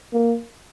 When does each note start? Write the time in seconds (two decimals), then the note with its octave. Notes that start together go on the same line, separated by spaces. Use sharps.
0.13 A#3